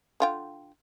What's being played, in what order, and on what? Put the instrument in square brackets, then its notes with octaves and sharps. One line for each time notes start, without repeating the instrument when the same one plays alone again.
[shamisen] D3 F4 G5